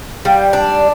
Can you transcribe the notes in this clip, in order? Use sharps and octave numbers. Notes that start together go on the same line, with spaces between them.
G3 F5 G5
D4